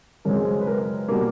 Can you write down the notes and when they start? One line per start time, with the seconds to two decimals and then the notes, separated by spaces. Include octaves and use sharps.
0.25 F#2 C#3 F3 G#3 C4 A#4
0.61 B4
0.67 A#4
1.08 B2 G3 A#3 A#4